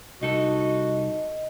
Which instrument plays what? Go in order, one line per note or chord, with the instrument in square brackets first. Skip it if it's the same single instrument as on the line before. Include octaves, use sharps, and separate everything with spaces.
[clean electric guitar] C2 D#4 A4 [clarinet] F#4 [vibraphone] D#5